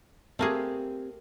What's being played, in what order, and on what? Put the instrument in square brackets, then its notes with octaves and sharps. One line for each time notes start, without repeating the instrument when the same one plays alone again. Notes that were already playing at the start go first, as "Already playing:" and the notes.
[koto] A3 A#3 G#4 [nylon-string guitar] C4 G4